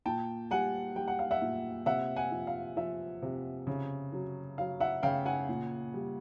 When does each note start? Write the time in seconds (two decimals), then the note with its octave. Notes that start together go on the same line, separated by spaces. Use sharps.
0.06 A#2 G5 A5
0.51 G3 F#5 G#5
0.96 G3 G5
1.08 F#5
1.19 F5
1.31 E5 F#5
1.42 A#2
1.86 C3 E5 F#5
2.16 F#5 G#5
2.31 F3
2.47 F5
2.77 F3 E5
3.22 C3
3.67 C#3
4.12 F#3
4.58 F#3 F5
4.80 E5 F#5
5.03 C#3 F5 G5
5.26 F#5 G#5
5.49 A#2
5.94 G3